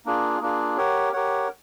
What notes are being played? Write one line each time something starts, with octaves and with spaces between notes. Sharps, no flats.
A#3 D4 F4 G#4
A#3 D4 F4 G#4
G4 A#4 C#5 F#5
G4 A#4 C#5 F#5